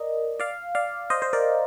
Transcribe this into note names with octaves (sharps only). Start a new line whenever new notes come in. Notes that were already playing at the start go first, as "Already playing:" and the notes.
Already playing: A#4 D5 D#5
D5 F5
D5 F5
C5 D#5
C5
A#4 D5